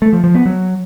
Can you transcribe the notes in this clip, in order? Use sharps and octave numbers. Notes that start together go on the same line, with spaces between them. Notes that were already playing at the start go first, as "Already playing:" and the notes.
A3
F3
F3
B3
F#3